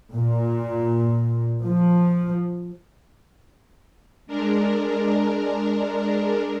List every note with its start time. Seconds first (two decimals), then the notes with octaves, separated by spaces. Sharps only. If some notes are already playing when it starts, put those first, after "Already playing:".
0.14 A#2
1.64 F3
4.27 G#3 D4 A#4